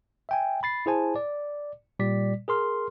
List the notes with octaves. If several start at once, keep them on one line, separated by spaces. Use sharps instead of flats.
E5 G5 G#5
B5 A6 C7
E4 G#4 C5 G#5 A5
D5
A#2 G3 D5 B6
G#4 A#4 C6 F6